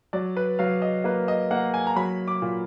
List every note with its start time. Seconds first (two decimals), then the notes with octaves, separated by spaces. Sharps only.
0.13 F#3 D5
0.37 B4
0.59 F#3 F5
0.82 D#5
1.04 A#3 B4
1.28 D#5
1.51 A#3 F#5
1.74 G#5
1.87 A#5
1.96 F#3 B5
2.28 D6
2.42 A#2